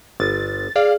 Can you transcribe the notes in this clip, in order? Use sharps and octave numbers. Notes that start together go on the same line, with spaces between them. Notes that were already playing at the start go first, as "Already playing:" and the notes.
G1 A6
G#4 D5 F5